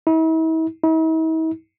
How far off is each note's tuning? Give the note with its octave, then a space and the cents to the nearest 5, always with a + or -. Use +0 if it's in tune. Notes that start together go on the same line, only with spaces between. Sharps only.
E4 -40
E4 -45